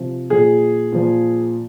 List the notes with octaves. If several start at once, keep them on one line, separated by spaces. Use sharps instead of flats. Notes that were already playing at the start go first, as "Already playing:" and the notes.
Already playing: C3 F3
A#2 F3 G#4
A#2 F3